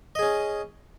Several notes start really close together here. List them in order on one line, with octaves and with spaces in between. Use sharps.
D#5 G#4 C#4